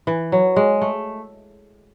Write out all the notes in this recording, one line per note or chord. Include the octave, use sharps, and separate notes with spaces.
E3
F#3
G#3
A3